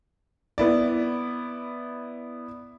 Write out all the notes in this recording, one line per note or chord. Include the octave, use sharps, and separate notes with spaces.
B3 E4 D5